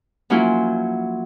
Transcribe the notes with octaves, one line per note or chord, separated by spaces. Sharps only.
F3 F#3 A#3 C#4 E4 F4